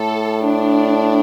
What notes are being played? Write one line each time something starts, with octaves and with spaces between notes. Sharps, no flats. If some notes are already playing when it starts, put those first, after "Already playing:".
Already playing: A2 A4
D4